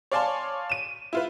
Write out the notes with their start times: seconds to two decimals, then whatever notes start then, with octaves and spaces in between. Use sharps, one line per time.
0.12 C#5 D5 F5 G#5 A5 C6
0.69 D#7 E7
1.13 E4 F4 B4